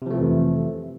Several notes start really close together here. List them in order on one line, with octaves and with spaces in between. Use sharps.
C3 F3 A3 E3 F2